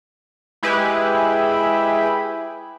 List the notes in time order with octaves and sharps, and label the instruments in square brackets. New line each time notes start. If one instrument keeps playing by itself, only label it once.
[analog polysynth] G#3 E4 G4 G#4 B4